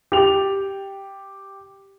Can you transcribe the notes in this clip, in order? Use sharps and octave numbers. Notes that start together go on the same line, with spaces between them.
G4 F7